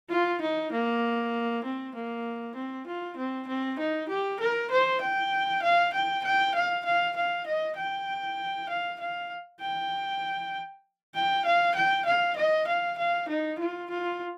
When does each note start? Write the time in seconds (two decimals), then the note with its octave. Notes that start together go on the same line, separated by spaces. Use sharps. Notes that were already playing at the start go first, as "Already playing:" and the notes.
0.10 F4
0.41 D#4
0.72 A#3
1.64 C4
1.94 A#3
2.55 C4
2.87 F4
3.17 C4
3.47 C4
3.79 D#4
4.08 G4
4.40 A#4
4.70 C5
5.01 G5
5.62 F5
5.93 G5
6.24 G5
6.55 F5
6.85 F5
7.16 F5
7.46 D#5
7.77 G5
8.69 F5
9.00 F5
9.61 G5
11.14 G5
11.45 F5
11.75 G5
12.05 F5
12.36 D#5
12.67 F5
12.98 F5
13.29 D#4
13.59 F4
13.90 F4